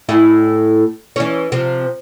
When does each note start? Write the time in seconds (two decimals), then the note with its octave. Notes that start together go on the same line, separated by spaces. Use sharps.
0.09 A2 E4 G#4
1.16 E3 C#4
1.52 C3 F3